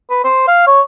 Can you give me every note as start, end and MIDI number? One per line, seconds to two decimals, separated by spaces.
0.10 0.23 71
0.24 0.44 72
0.47 0.64 77
0.67 0.81 73